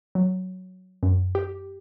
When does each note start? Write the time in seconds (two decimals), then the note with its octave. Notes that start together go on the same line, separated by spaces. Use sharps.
0.15 F#3
1.03 F#2
1.35 G4